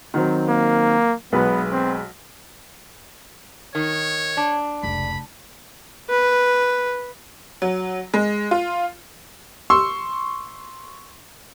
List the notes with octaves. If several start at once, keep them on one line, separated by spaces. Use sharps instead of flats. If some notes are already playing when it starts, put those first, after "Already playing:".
D#3 F#3 C4
A#3
B1 G#3 B3 B4
C4
D#3 C#5
D4
F1 C#2 B5
B4
F#3
G#3
F4
C6 C#6 E6